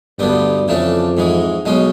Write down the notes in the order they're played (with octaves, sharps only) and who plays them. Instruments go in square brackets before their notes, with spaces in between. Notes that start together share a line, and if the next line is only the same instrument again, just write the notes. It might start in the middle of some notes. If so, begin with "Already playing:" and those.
[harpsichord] D2 D3 G3 B3 [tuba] G2
[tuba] F2 [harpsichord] C#3 E3 A3 D4
[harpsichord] G#2 E3 G#3
B1 B2 G#3 C#4